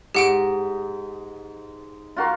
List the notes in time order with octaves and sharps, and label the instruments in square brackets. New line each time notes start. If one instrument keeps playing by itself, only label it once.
[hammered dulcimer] G#2 [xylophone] G4 F#5 D7
[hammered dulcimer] F4 F#4 A#4